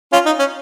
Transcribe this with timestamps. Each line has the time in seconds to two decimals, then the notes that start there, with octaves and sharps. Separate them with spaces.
0.13 C#4 F4
0.26 D#4
0.39 C#4